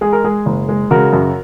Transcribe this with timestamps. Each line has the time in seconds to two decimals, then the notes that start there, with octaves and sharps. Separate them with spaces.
0.01 G#3 G#4
0.13 A#4
0.24 G#3 G#4
0.46 F#1
0.69 G#3
0.91 C#3 F#4 A#4
1.13 F#2